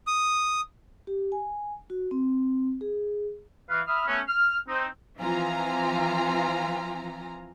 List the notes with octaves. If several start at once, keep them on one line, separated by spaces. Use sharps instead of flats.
D#6
G4
G#5
F#4
C4
G#4
E3 B4 F5
E5 B5 D#6 F6
A3 B3 C#4
F6
C4 D#4
E3 F3 C4 F4 G#5 A#5